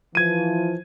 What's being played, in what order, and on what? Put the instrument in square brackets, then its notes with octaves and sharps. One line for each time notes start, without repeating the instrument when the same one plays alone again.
[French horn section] E3 F3 [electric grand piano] G#6 D#7